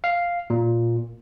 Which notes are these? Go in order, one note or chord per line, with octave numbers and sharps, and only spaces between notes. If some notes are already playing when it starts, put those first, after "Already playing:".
F5
A#2